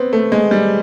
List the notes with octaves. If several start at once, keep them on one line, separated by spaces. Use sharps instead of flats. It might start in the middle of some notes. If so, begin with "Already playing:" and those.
Already playing: B3 C4
A3
G#3
G3